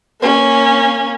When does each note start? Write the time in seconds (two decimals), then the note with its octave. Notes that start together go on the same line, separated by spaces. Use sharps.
0.21 A#3 C#4